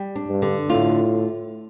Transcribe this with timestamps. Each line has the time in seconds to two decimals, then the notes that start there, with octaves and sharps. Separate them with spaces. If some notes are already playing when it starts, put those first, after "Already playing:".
Already playing: G3
0.16 D4
0.28 G2
0.42 D3
0.70 A2 F4